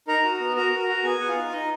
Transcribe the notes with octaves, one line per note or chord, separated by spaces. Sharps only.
D#4 A#4 A#5
F#4
B3
F#4 A#4 A#5
F#4
A#4 A#5
F#4
B3 G#4 G#5
B3 F#5
F4 F5
D#4
D#4 D#5